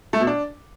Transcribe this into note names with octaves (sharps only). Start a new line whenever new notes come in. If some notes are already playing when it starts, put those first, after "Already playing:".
A3
B2
D4